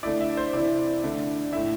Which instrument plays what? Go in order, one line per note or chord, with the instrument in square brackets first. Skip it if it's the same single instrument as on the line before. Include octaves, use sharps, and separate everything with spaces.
[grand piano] D3 A3 E4 D5
E5
C5
C3 E3 C4 E4 D5
D3 A3 E4
A2 A3 E4 E5